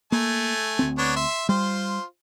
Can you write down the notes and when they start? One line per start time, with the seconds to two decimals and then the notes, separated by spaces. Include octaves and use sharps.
0.12 A3 A#3 G#5
0.79 D2 C4
0.98 B3 D4 C#5
1.16 E5 C6
1.49 G3 F4 C5